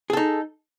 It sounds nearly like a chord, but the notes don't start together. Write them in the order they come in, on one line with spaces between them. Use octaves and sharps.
G#4 A4 D#4